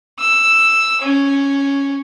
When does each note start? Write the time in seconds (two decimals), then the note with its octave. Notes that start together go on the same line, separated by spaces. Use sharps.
0.19 E6
1.01 C#4